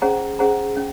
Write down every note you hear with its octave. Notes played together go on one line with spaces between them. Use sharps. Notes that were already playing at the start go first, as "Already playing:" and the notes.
C#4 G#4 C5 F#5 A#5
C#4 G#4 C5 F#5 A#5
C#4